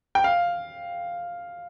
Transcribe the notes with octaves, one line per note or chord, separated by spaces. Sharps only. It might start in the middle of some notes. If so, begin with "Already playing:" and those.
G5
F5